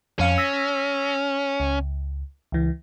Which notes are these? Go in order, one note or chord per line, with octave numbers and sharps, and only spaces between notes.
F2 C#4 F5 C#7
E6 A#6 B6
C#2
C#2 E3